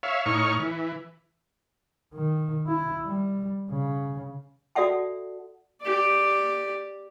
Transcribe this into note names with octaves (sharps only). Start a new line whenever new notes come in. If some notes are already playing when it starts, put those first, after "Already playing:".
C#5 E5 F5
A2 D#4 C#5 C#6 F6
E3
D#3
E4
G3
C#3
F#4 A4 D5 E5 F#5 A5
G4 D5